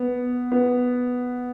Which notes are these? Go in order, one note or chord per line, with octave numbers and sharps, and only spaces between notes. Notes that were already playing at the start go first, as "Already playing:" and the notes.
Already playing: B3
B3